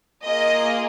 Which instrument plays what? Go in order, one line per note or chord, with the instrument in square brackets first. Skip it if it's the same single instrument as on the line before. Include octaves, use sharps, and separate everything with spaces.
[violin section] A#3 F4 G#4 D#5